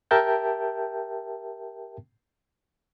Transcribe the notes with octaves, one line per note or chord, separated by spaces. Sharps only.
G4 A#4 E5 G5 A5 G6